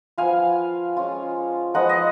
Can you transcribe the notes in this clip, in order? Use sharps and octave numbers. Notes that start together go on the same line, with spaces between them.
F3 B3 F4 F5 G#5
G#3 C#4 F4
F3 G#3 B3 D#4 D#5 F#5
D#5